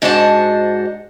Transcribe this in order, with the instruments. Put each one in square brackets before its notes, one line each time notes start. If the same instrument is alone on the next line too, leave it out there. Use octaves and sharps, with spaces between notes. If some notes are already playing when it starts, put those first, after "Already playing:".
[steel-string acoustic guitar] G#2 D4 F#4 C5 D#5 A5